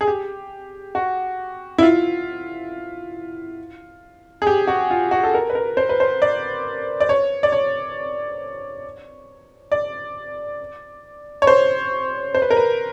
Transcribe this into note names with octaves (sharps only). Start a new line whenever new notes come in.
G#4
G4
F#4
E4
F4
G#4
G4
F#4
F4
F#4
A4
A#4
B4
A#4
C5
B4
C5
D5
D5
C#5
D5
C#5
D5
C#5
C5
C5
B4
A#4
B4